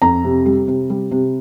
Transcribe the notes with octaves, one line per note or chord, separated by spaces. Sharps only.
F2 A#5
C3
G3
C3
G3
C3